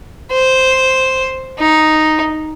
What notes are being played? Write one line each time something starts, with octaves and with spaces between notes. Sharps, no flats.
C5
D#4